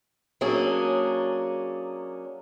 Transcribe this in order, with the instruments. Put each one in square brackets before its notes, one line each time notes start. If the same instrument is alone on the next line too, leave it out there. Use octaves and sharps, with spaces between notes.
[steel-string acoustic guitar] F#3 A#3 C#4 D4 G#4